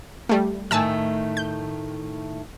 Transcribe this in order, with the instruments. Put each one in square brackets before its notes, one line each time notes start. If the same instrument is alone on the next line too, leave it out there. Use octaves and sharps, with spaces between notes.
[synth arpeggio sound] G3 A3
[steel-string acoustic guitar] A2 D#3 A3 [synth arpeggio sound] G#5 A5 E6
[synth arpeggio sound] G6